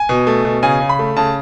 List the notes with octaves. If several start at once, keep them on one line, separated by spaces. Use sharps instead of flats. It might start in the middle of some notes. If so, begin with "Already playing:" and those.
Already playing: G#5
B2
A3
B2
C#3 G#5
C#3
B5
A3
C#3 A5